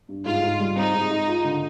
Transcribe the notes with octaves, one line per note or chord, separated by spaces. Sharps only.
G2
G#2 F4
G#2
G3
C4 D#4
G#2
G#2
F4
D3